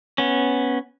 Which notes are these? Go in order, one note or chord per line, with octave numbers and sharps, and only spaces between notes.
B3 C#4